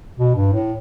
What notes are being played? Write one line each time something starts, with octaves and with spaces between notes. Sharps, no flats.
B2
G2
A2